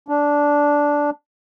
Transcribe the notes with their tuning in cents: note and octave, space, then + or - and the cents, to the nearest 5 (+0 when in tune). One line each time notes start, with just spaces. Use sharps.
D4 -10